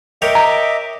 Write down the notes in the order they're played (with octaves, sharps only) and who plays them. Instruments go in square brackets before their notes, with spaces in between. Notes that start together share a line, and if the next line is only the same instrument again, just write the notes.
[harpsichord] A#4 C#5 G5 [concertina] D#5 E5 D6
[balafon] A#5